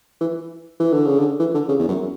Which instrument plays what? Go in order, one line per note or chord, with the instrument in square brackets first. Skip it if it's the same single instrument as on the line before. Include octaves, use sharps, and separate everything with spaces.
[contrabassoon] E3
E3
D3
C#3
D3
E3
D3
C#3
E2
F#2